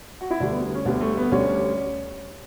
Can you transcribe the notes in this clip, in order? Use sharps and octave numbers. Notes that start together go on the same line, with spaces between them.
F#4
E4
D2 D3 G3 D4
B3
B3
C#4
D2 D3 G3 B3
A3
B3
D2 D3 G3 C#4